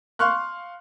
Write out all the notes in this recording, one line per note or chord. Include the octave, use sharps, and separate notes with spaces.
F5 C6 C#6 F6 F#6